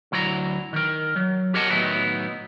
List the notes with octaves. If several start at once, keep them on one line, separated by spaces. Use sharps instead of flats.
D2 F#3 E4 D5 A#5
D#3 A#4
F#3
G4 A#4 C#5 D#5 F#5 A5
A2 D#3 F#3 B3 D#4 E4